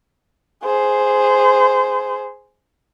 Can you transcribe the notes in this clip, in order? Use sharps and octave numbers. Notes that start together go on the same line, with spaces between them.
G#4 C5